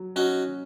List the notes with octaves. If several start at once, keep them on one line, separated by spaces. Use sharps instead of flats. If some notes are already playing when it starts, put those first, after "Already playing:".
Already playing: F#3
C#4 D#4 F#4